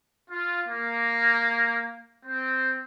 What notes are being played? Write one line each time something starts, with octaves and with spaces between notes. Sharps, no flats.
F4
A#3
C4